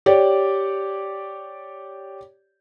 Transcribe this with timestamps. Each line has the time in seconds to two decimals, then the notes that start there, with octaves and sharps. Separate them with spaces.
0.06 G4 C#5 D5